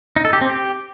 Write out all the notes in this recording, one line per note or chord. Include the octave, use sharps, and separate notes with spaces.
D#4
A4
G4
C4
G4